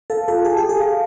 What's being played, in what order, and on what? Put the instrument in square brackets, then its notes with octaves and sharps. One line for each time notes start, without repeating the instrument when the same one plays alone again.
[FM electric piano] A4 [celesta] F5
[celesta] F4 [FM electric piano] A4
[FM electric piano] G#4 [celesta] A5
[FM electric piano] G4
[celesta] A4
[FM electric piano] G#4
[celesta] F5